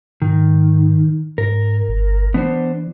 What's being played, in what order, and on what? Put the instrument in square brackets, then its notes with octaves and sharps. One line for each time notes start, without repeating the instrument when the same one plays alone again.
[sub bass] G#2 [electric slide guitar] D#3
[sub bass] G#2 [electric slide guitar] A#4
[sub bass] G1
[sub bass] E3 [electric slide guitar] B3 D4 C5